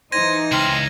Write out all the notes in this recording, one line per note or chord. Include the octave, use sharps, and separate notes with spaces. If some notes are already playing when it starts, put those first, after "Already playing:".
E3 D#4 C5 G#6 A#6 D#7
C#2 C4 F6 F#7